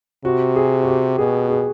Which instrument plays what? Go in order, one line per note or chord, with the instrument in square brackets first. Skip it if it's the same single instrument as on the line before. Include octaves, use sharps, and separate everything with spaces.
[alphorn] C3 [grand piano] F#4
[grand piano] G#4
F#4
G4
[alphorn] B2 [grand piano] G#4
[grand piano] G#4